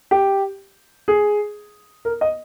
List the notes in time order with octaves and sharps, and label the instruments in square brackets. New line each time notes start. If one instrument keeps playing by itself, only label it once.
[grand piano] G4
G#4
A#4
D#5